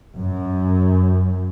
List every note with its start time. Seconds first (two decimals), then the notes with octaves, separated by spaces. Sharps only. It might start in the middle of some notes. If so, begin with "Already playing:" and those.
0.16 F#2